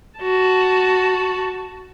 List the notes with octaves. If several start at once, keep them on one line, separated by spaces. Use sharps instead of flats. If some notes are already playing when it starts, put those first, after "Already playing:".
F#4 A5